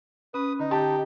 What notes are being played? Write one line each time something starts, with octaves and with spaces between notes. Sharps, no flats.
C#4 B4 D#6
D3 D#4
G4 A5